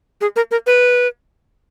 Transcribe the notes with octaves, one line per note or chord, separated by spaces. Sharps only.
G#4
A#4
A#4
B4